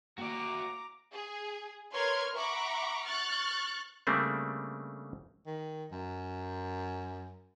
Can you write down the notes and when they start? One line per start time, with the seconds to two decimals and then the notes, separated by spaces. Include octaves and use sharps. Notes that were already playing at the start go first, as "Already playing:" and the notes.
0.18 A#3 F#4 D5 G5 A#5 D6
1.13 G#4
1.91 A#4 B4 C#5 C6 F6 G#6
2.36 E5 F#5 A#5 B5 C#6 D6
3.05 C#6 F6 F#6 A6
4.07 C#3 G3 A3 A#3 C4 D4
5.46 D#3
5.91 F#2